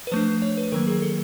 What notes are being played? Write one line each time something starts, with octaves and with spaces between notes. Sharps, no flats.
B4
F3 A3 D4 C5
C#5
B4
D#3 F#3 A#3 A#4
G#4
A4